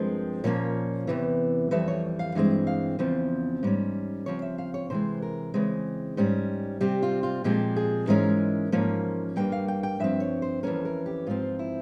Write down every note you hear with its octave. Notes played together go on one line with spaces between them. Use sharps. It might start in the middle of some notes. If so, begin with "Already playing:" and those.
Already playing: G2 F3 G#3 C4 A#4
A#2 F3 A#3 C#4 C#5
E2 C3 E3
F2 E3 G3 E5
C#5
F5
G2 E3 G#3 C4
F5
E2 C#3 F3 C4
G#2 G3 C#4
C#3 F3 C4 C#5
E5
F5
C#5
C3 E3 G#3 C5
A#4
C#3 E3 G#3 C4
G#2 G3 C#4
C3 G3 C4 G4
F4
F4
A#2 F3 G#3 C4 G4
G#4
G#2 E3 G#3 C#4 A#4
G#2 F3 A#3 C#4
G2 G3 A#3 G5
F5
G5
G5
G2 F3 C4 E5
C#5
C5
F2 E3 A#3 C#4 A#4
A#4
G4
G#2 F3 C4 F4
E4